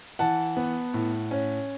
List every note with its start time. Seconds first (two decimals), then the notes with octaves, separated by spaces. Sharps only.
0.19 E3 F#5 A5
0.57 B3
0.94 A2
1.31 C#4